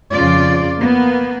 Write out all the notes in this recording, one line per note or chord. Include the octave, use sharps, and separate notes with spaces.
F2 C#3 F4 D5
A#3 B3